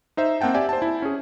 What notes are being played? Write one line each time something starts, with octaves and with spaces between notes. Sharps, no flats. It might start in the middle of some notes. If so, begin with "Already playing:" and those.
D#4 C5 E5
A#3 C4 F#5 G5 A5
G4 D5 E5 G#5
C5 A5
E4
C#4 G#4